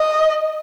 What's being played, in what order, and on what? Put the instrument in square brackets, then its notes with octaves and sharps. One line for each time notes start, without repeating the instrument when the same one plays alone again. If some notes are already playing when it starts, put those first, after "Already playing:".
Already playing: [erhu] D#5